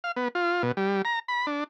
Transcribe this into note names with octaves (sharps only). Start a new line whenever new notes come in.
F5
B3
F4
B2
G3
A#5
B5
D4